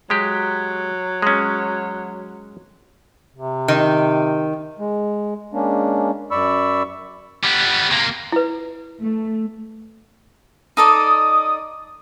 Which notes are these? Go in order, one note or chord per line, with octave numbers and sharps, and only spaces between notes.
F#3 G#3 G4
G#3 C#4
C3
D#3
G#3
G#3 A#3 C#4 D4
F#2 D5 B5 C#6 E6
G3 B3
C3 A#3
E4 B4
A3
D#4 A4 D5 D#6